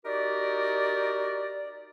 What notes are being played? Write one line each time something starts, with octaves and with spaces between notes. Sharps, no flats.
D#4 F#4 G4 A#4 D5